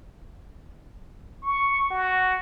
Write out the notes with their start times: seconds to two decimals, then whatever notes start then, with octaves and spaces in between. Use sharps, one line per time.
1.43 C#6
1.90 F#4